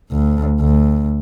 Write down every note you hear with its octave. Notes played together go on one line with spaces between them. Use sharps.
D2
D2